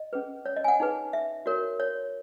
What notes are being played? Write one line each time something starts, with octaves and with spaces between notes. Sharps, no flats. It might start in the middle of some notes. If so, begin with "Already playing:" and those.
Already playing: D#5
C#4 G#4 B4
C#5
D#5
G#5
F#5
D#4 G#4 B4
E5
F#4 A#4 C#5
C#5